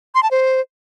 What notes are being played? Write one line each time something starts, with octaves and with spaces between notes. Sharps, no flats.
C6
A5
C5